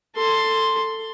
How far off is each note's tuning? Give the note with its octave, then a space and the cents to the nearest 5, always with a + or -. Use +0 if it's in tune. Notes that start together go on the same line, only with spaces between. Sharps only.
A4 +15 C6 +0